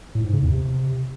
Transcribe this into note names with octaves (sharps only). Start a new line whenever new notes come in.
A2
G#2
C#3
E2
C3